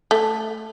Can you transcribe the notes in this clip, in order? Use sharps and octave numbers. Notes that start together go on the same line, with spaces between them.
A3